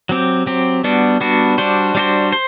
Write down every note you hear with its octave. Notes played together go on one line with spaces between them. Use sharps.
F#3 C4 G4
F#3 C4 G4
G3 B3 D4 F#4
G3 B3 D4 F#4
G3 D4 F#4 C5
G3 D4 F#4 C5
C5